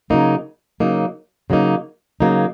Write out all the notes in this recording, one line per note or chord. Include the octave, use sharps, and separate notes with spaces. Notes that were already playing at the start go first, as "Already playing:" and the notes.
C#3 F#3 A#3 D#4
C#3 F#3 A#3 D#4
C#3 F#3 A#3 D#4
C#3 F#3 A#3 D#4